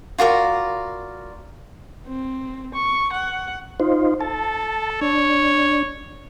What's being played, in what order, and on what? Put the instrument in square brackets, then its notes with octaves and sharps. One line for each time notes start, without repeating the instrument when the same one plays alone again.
[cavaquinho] F4 F#4 A#4 D5
[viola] C4
C#6
F#5
[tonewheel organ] D#4 F4 C5
[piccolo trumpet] A4 [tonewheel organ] A5
[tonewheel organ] D4 [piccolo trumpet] C#5